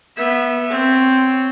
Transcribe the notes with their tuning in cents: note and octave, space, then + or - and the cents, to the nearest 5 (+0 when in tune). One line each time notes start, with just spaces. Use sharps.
B3 -20 E5 +0
C4 +0 C#5 +0